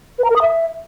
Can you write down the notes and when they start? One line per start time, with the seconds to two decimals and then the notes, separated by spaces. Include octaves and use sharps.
0.19 B4
0.24 A#5
0.30 A#4
0.36 D#6
0.42 E5